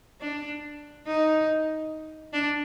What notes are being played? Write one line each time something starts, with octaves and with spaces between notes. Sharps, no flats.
D4
D#4
D4